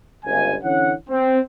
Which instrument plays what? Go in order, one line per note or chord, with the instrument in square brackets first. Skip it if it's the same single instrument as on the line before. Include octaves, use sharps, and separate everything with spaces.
[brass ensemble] G1 C#2 G#5
D3 E3 C#4 C#5 F#5
C4